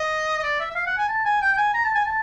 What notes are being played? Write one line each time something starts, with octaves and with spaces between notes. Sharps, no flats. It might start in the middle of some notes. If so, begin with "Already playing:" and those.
Already playing: D#5
D#5
D5
E5
E5
F5
F#5
G#5
A5
G#5
G5
G5
G#5
A#5
A5
G#5
A5